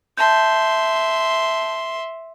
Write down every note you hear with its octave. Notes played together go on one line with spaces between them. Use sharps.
E5 A5 C6 G6